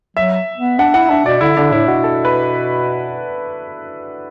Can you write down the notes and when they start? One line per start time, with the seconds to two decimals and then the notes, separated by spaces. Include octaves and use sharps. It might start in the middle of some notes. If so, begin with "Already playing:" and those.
0.17 F#3 E5
0.57 B3
0.79 D4 F#5
0.94 E4 F#5
1.10 D4 E5
1.26 B2 D5
1.41 D3 E4
1.57 D3 D4
1.72 A2 E4
1.88 B2 F#4
2.04 A4
2.25 B4